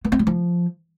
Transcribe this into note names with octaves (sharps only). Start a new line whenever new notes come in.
B3
C4
F#3
F3